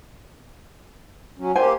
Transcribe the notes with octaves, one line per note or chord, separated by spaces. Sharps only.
F#3 C#4
A#3 G4 C5 G#5